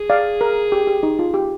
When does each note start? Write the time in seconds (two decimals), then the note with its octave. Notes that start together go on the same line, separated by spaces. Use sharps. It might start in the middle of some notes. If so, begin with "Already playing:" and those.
Already playing: G#4
0.10 D5 F5
0.41 A#4
0.72 G4
0.87 G4
1.03 D#4
1.19 F4
1.34 G4